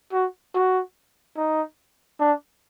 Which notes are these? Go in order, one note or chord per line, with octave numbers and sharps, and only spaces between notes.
F#4
F#4
D#4
D4